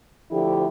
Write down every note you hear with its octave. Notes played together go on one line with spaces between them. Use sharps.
D2 D3 F3 E4 G4